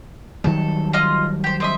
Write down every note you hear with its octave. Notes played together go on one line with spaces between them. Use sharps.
D#3 F#3 G3 A4
F4 D#5 F6
G4 C5
C4 D#5 E5